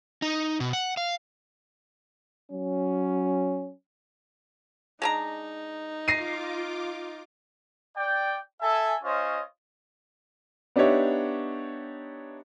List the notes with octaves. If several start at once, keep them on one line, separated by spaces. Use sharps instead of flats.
D#4
B2
F#5
F5
F#3 C#4
G#3 D4 D#4 A#5
F4 D6 A#6 C7 D#7
D5 G5
A4 E5 G#5
C#4 F4 C5 C#5 D#5
B3 D4 D#4 G4 C#5 E5